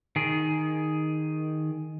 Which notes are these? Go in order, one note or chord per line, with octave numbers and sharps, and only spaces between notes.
D#3 G#4